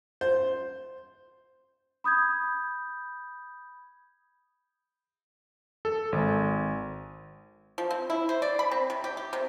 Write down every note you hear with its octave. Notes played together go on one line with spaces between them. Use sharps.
C5
B5 D#6 G6 G#6
A4
G#1
F3
C4
E4
C5
D5
B5
C4
C3
G4
G4
C3